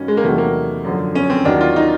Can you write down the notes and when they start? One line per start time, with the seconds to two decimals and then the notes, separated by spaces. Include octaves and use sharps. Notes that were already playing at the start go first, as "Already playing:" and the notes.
Already playing: G2 D#3 F#3 C#4
0.08 G#3
0.17 A#3
0.24 E2 C3 D#3 F#3 A3
0.38 A#3
0.84 F#2 D3 F3
1.15 C#4
1.30 C4
1.45 D#2 D#3 F#3 D4
1.61 F4
1.76 D#4